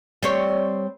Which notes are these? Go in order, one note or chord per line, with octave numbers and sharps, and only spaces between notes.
G3 C4 C#5